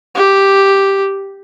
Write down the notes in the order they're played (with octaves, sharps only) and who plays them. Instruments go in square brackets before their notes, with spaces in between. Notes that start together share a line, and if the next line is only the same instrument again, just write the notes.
[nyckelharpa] G4